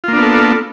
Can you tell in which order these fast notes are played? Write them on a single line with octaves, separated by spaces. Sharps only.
F4 A#3 D4 B3 A4